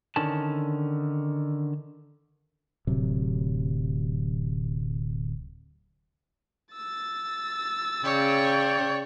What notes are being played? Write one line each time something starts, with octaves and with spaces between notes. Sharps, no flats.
D3 D#3 C#4 A5
D1 C3 F#3
E6 A6
C#3 C#5 D5 G5